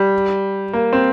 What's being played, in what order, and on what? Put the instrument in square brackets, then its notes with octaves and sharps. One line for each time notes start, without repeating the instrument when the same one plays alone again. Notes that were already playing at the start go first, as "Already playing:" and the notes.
Already playing: [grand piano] G3
A#3
C4